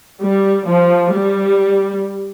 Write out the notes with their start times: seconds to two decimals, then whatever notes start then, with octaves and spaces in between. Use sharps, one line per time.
0.21 G3
0.68 F3
1.13 G3